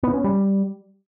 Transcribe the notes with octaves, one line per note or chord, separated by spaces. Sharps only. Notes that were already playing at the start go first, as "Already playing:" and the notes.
B3
C#4
G3